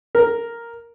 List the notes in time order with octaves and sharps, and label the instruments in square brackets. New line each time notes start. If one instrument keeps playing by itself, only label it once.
[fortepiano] A#4